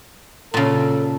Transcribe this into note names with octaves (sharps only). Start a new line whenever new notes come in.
A#2 C#3 A4